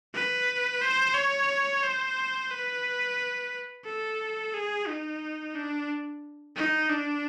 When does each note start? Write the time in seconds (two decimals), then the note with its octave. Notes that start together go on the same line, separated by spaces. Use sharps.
0.14 B4
0.81 C5
1.15 C#5
1.83 C5
2.51 B4
3.85 A4
4.54 G#4
4.87 D#4
5.55 D4
6.56 D#4
6.90 D4